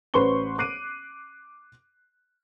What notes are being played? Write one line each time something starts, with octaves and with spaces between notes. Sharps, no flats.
A1 B4 C5 C6 C#6 G7
D6 F#6 C7 D7 D#7